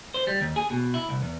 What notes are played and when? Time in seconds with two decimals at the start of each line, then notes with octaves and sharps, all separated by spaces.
0.14 C5
0.27 G3
0.40 D#2
0.56 G#4
0.70 B2
0.94 E4
1.09 C2
1.22 E2